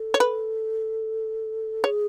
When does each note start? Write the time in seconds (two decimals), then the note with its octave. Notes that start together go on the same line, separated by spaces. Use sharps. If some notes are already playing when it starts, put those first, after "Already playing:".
Already playing: A4
0.14 C#5
0.20 B4
1.84 G#4 C#5